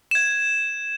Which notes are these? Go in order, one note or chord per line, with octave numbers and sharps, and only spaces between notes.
G#6 E7